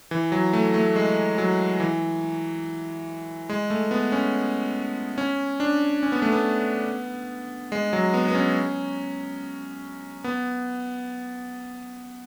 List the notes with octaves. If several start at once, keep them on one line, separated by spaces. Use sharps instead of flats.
E3
F#3
A3
A3
G#3
F#3
E3
G#3
A3
B3
C#4
C#4
D4
C#4
B3
A3
B3
G#3
F#3
B3
B3
C#4
B3